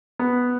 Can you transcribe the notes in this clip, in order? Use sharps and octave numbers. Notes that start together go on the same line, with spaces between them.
B3